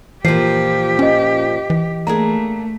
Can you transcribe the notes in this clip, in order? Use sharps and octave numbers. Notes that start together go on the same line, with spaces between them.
A#2 E3 F3 G4 C7
C#4 D#5 B6
E3
A3 A#3 D4 G#4 A#5